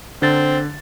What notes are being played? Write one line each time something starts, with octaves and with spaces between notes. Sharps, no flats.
D3 C4 A6